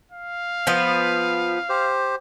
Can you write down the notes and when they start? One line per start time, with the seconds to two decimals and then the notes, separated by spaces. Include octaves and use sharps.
0.12 F5
0.67 F3 B3
1.69 G4 C5